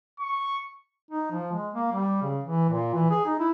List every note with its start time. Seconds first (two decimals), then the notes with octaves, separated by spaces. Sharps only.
0.20 C#6
1.11 D#4
1.31 F3
1.52 G#3
1.74 A#3
1.92 G3
2.22 C#3
2.44 E3
2.70 A#2
2.94 E3
3.11 G#4
3.26 D#4
3.39 E4